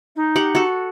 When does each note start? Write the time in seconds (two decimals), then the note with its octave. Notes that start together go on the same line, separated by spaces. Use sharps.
0.16 D#4
0.36 G4 F#5
0.55 F#4 A4